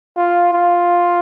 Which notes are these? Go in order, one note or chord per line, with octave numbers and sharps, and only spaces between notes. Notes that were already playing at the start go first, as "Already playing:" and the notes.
F4
F4